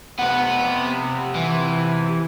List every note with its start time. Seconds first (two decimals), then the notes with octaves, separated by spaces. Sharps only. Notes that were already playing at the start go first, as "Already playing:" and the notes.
0.19 C3 B3 B4 F#5
1.36 E3